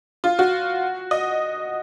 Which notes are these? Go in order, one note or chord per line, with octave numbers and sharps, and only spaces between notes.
F4
F#4
D#5